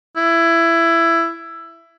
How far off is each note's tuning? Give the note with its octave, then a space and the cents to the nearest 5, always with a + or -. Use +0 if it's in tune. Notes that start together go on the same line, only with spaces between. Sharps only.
E4 +15